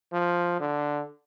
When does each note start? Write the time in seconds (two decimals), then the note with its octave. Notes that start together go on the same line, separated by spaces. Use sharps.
0.13 F3
0.60 D3